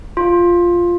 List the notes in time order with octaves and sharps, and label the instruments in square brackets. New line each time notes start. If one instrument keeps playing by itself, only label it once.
[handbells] F4